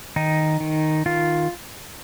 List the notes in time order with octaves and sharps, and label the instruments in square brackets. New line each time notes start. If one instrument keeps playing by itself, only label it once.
[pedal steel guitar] D#3 D#4
D#3
D#3 F4